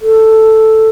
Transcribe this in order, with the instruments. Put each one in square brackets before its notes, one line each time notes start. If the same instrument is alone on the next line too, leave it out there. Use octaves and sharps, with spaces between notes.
[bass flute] A4